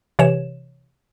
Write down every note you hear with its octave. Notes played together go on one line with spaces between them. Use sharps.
C3 E3 C#5 E7